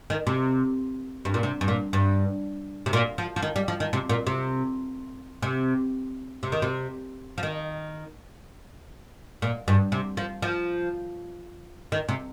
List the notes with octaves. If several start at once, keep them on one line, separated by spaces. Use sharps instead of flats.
D#3
C3
G2
A#2
C3
G2
A#2
G2
C3
A#2
F3
F3
D#3
G3
F3
D#3
C3
A#2
C3
C3
C3
D#3
C3
F3
D#3
A#2
G2
C3
F3
F3
D#3
C3